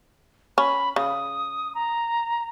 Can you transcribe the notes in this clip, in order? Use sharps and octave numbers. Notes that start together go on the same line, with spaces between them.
C#4 B5
C#3 D#6
A#5